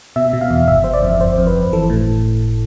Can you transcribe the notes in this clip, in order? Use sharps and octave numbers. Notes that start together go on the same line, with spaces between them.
B2 E5
B2
F5
E2
G1 E5
G1 C5
D5
F2
G1 C5
F2
B4
G1
E3 A4
A2